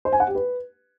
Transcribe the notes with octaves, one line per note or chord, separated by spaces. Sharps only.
C5
G#5
F#5
G4
B4